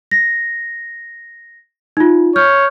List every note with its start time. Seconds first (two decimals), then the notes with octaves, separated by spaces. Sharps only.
0.11 A#6
1.97 D#4 F4
2.36 C#5 F6 G6